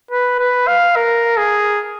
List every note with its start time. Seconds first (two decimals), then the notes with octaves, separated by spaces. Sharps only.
0.11 B4
0.40 B4
0.68 F5
0.96 A#4
1.37 G#4